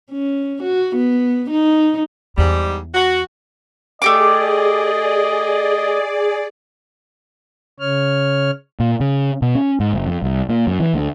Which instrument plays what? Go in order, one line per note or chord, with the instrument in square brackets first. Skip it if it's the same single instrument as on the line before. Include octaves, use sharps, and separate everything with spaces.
[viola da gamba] C#4
F#4
B3
D#4
[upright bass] E2 [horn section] G#2 G3
[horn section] F#4
[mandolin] A3 G4 D6 [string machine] G#4 D5 [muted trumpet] D#5
[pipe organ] C#3 C#5 F6
[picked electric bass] A#2
C#3
B2
C#4
G#2
F#1
F2
C2
A#2
F#2
E3
D2